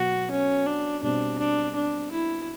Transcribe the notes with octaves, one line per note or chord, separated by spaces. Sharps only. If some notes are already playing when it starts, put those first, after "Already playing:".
Already playing: B2 F#3 B3 F#4
C#4
D4
B2 G3 C4 D4
D4
D4
E4